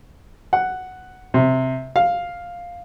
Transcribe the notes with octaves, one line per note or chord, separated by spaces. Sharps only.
F#5
C3
F5